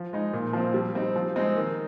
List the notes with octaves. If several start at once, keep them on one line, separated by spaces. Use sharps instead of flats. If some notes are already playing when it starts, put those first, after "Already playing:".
Already playing: F3
G#3 D#4
A#2
F3 C4
G3
C4 D#4
F3
G#3 C4 D#4
D#3